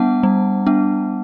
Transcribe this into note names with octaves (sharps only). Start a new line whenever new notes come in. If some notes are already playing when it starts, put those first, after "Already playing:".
Already playing: G3 B3 D4 F#5 A5
G3
B3 D4